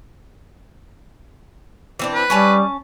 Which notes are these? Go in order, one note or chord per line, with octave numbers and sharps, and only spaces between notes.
E3 C4 D4
B4
G3 C#4 G#5 A5